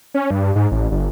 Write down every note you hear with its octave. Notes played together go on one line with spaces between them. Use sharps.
C#4
G2
G#2
A1
G1